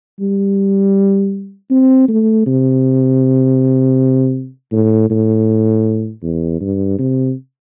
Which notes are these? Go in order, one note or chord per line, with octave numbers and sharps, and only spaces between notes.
G3
C4
A3
C3
A2
A2
E2
G2
C3